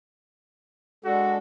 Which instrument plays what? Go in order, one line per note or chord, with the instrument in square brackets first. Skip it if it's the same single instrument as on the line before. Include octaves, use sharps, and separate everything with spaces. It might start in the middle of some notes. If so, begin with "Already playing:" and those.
[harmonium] G#3 D4 A4 [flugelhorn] F#4